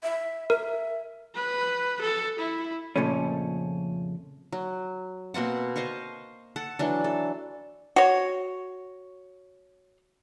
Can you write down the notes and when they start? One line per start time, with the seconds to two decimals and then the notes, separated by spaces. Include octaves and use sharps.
0.03 E5
0.50 A#4 E5
1.35 B4
2.02 A4
2.39 E4
2.96 F2 A#2 C#3 F3 A3 C#4
4.52 F#3
5.34 B2 A#3 C4 F#5
5.76 C5 D#5 F5 C#6
6.56 A4 F#5
6.79 E3 F#3 D4
7.04 A4
7.96 F#4 C#5